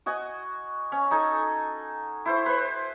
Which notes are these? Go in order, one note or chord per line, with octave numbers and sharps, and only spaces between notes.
F#4 D#5 G#5
C#4
D#4 A4 G#5
E4 C5 C#6
B4 C5